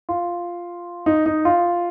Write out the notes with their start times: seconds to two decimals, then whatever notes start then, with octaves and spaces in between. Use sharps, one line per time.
0.09 F4
1.06 D#4
1.26 D#4
1.45 F4